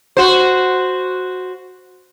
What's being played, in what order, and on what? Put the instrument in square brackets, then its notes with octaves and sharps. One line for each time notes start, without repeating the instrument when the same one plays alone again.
[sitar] F#4 C5